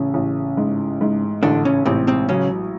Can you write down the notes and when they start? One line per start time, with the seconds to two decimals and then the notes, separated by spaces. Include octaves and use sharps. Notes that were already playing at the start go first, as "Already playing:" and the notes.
Already playing: A1 C#3 C#4
0.14 A1
0.57 G#2
1.01 G#2
1.43 A1 D3 D4
1.65 C#3 C#4
1.85 A1 C3 C4
2.07 C3 C4
2.29 C#3 F#3 C#4